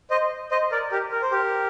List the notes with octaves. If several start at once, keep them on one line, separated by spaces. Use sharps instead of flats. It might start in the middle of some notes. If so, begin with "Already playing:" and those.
C5 D#5
C5 D#5
A#4 D5
G4 A#4
A#4
C5
G4 A#4